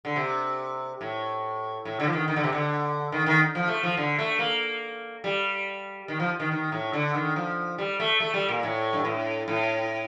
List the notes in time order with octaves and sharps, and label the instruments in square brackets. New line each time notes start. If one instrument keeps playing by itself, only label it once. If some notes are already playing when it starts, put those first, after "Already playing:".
[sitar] D3
C3
A2
A2
D3
F3
D#3
D#3
D3
C3
D3
D#3
D#3
F3
A3
F3
D3
A3
A#3
G3
D#3
F3
D#3
D#3
A2
D3
D#3
F3
G3
A3
A3
G3
A#2
A2
G2
A2
A2